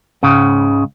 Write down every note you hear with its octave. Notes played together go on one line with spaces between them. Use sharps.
C#2 G#2 C#3